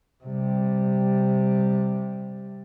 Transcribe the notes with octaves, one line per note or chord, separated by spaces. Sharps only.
C3 G3